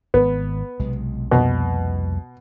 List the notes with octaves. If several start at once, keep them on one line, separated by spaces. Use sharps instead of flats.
G#1 B3
B1 C3 G#3
C2 F2 B2 A#3